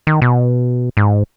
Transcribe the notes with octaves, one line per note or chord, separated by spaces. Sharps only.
D#3
B2
G#2